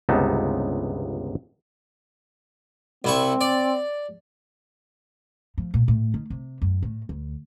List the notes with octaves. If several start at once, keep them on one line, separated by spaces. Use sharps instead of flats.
G1 C#2 C3 B3 D#4 A5
C2 C4 E4 C#6
D5
F3
A#2
A2
D#3
C3
F#2
A2
D2